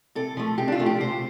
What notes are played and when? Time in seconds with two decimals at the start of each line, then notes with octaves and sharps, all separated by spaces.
0.15 C3 A4
0.37 F3 A3
0.58 C3 G4
0.68 D4
0.72 F4
0.79 F3 A3
0.86 G4
1.00 C3 C5